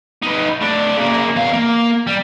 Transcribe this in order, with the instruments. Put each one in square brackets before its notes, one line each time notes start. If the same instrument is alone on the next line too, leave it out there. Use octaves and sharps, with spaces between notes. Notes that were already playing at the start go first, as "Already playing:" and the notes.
[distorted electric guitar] D#4 B4
A2 D4
C#3 A#3
E2 F5
A#3
G3